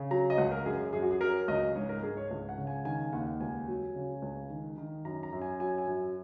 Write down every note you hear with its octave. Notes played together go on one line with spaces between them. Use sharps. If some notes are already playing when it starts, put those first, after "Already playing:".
Already playing: C#3
F#3 A#5
D#5
C#2 F#5
A#4
F#2 G#4
F#2 G#4
F#4
G#4
F#3 A#4
C#2 D#5
G#2 C#5
A#4
G#2 G#4
C#5
C#2
F#5
C#3
G#5
D#3 G#5
D#2 F#5
C#2 G#5
F#3
C#3
C#2
D#3
D#3
F#2 A#5
A#5
F#2
G#5
F#3 G#5
G#5
F#2